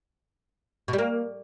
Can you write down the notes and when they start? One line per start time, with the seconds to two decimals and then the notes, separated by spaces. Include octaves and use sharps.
0.88 B2
0.93 G3
0.98 A#3